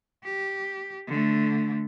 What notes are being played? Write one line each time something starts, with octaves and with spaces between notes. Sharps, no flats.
G4
D3 A3